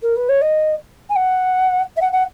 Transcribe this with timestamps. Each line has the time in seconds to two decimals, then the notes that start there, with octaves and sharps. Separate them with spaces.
0.02 A#4
0.16 B4
0.29 C#5
0.41 D#5
1.09 G#5
1.16 F#5
1.96 E5
2.01 F#5
2.12 F#5